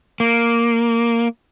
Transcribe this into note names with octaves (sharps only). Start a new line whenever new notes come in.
A#3